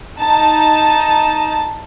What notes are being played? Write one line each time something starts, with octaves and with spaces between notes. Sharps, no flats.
D#4 A5